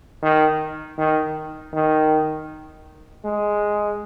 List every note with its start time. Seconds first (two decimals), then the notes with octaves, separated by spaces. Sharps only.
0.22 D#3
0.98 D#3
1.73 D#3
3.25 G#3